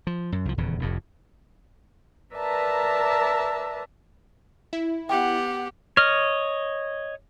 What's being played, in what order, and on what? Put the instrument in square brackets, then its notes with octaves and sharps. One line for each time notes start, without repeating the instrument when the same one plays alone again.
[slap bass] F3
F#2
C2 F3
D#1 E2 C#3
F1 F2 A2
[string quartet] A#4 B4 D5 E5 A5 A#5
[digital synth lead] E4
[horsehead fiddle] B3 F#5 [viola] G4 [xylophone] G5
[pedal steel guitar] C#5 D#5 [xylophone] F6